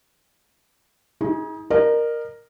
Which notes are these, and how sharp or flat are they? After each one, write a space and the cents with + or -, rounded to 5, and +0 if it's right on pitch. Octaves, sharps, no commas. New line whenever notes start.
D#4 +40 G#4 +0
A#4 +0 D#5 -45